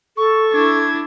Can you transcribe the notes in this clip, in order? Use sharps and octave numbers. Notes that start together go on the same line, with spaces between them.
A4 C#6
D4 E4 G#6